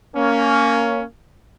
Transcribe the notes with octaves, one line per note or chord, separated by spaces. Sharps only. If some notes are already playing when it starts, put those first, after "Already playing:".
A#3 C#4